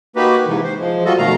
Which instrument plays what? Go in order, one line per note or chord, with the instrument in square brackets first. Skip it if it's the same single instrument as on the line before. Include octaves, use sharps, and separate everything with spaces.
[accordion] A#3 D#4 F#4 G4 B4
G#2 C3 E3
C5
F3 G#3
G3 F4 F#4 A4 D#5
F2 B2 D#3 A3 F5 A#5